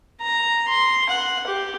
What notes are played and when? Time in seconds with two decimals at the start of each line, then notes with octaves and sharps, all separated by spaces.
0.21 A#5
0.68 C6
1.09 F#5
1.47 G4